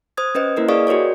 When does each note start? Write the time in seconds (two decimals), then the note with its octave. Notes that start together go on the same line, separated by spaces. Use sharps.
0.17 C5 D#6 G#6
0.35 C#4 B4 C5 D#5
0.57 A#3 E4 A#4 B4
0.69 G#4 D5 D#5 F5 C#6 D#6
0.87 F#4 G4 A#4 C#5 D5